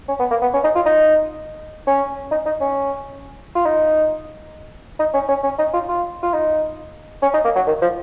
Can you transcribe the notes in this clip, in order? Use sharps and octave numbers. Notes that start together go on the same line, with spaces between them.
C#4
B3
A#3
B3
C#4
D#4
F4
D#4
C#4
D#4
D#4
C#4
F4
D#4
D#4
C#4
C#4
C#4
D#4
F4
F4
F4
D#4
C#4
D#4
A#3
F#3
D#3
F3